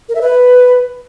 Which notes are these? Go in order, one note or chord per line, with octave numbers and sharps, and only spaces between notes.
A#4
E5
B4